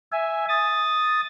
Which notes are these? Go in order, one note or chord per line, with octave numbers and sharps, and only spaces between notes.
E5 G#5
D#6 A6